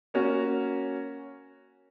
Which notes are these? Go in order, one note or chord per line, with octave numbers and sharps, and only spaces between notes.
A#3 C#4 F#4